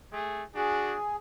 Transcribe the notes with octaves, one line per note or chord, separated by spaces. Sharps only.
A3 G#4
D4 F#4 G#4